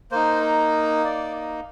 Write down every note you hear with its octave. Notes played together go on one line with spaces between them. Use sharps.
A#3 D#4 C5
D5